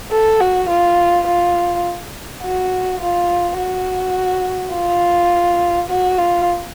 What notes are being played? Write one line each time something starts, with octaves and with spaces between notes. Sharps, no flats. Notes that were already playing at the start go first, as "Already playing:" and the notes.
A4
F#4
F4
F4
F#4
F4
F#4
F4
F#4
F4